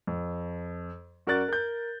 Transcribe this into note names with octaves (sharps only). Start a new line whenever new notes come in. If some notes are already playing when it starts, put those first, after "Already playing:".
F2
F#2 F#4 A#4 D5 F#6 A6
A#4 G6